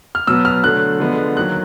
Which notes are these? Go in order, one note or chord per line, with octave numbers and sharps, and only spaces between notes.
F6
B2 F#3 B3 E6
F6
D3 F#3 A3 F#6
D3 F3 G#3 B3
D#3 F#3 A#3 F#6